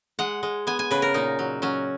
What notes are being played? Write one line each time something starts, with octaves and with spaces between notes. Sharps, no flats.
G#3 F#5
G#3
B3 G#5
G#5
C#3 B4
A#4
A#2 D#4
F#3
F#3 C#4